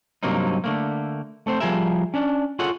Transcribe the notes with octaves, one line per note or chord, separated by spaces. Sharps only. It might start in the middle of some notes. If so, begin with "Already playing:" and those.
G2 C3 F#3 A#3 C4 D#4
D3 A3 A#3
A3 C4 C5
F3 G3 G#4 A#4 E5
C#4 D4
F4 G#4 A4 C#5 F#5